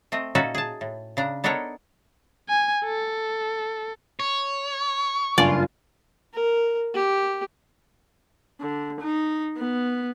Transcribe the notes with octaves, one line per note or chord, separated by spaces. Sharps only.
A3 C4 D#5
A#2 C#4 D#4 F#4 A4 E5
G#4 A5
A2
C#3 D4 A#5
B3 D4 D#4 A4 A#4 C#5
G#5
A4
C#5
F#1 G2 F4 D5 G#5
A#4
G4
D3
D#4
B3